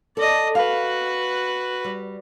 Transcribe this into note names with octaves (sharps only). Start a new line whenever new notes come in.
A4 D5 D#5
F#4 B4 F5
G3